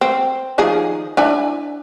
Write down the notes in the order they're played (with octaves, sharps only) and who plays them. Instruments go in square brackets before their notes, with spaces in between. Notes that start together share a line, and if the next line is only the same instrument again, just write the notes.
[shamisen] C4
D#3 F3 G#4
D4 E4 G#5